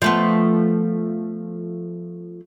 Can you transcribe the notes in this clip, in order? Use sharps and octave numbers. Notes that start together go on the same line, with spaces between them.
F3 A3 B3